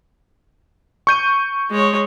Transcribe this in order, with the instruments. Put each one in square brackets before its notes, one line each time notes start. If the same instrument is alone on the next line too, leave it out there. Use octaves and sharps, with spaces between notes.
[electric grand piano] C#6 G6 D#7
[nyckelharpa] G#3 C#5